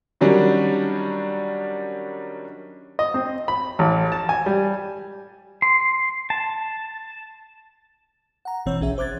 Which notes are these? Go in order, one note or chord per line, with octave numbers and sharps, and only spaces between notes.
D#3 F#3 G3 C#4 D4
D#5
C4
B5
A1
A5
G#5
G3
C6
A5
F#5 A#5
G1 B2 E3 C4 C#5 E6
B1 C#4 G#4 E5
C5 D6 F#6 G#6 A6